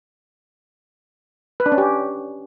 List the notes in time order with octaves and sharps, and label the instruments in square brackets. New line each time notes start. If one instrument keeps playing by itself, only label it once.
[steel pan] B4
D4
C#4
G4